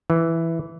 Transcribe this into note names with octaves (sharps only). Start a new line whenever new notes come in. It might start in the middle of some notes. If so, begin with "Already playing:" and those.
E3